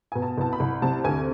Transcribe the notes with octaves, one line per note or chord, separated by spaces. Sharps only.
B2 G#5
A5
C2 A5
B5
C2
C3 A5
D2 G#5